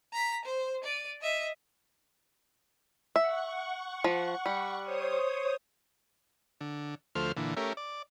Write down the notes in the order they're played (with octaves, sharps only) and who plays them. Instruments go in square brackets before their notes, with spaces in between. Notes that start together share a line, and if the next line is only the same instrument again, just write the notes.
[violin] A#5 B6
C5
D5 D#7
D#5 E5
[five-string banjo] E5 [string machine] F#5 C#6
[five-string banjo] F3
G3
[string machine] C5 C#5 D#6
[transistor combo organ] D3
D2 F3 A3 C5 F6
A#2 D3 E3
A3 C#4 G4 A#4 E5
D5